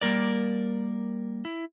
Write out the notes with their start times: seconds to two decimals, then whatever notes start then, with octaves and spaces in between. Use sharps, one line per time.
0.01 G3 A#3 A#4 D5
1.45 E4